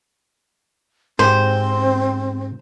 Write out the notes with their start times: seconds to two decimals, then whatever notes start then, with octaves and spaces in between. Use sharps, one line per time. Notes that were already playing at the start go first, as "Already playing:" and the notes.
1.19 G#2 C4 G4 C5